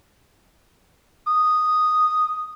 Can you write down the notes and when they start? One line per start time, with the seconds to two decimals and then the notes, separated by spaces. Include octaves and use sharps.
1.27 D#6